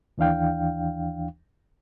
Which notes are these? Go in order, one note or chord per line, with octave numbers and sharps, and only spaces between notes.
D#2 E3 D4 F5 G5